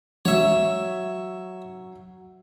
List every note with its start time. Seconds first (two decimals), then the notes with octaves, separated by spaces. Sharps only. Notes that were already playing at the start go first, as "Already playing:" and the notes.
0.25 F#3 C#5 E5